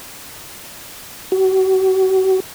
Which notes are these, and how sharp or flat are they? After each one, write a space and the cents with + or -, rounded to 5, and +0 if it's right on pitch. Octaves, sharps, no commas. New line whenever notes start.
F#4 +40